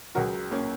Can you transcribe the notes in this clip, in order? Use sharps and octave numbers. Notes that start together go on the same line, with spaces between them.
C#2 C#3 F#3 F#4 A#4
A#3 C#4